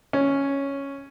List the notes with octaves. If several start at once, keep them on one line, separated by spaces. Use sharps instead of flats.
C#4